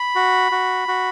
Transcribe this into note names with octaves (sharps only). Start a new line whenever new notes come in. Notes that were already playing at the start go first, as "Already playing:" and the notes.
Already playing: B5
F#4
F#4
F#4